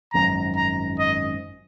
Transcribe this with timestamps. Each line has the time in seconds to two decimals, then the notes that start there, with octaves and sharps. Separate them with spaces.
0.13 G#1 F#2 F3 A#5
0.56 A#5
0.99 D#5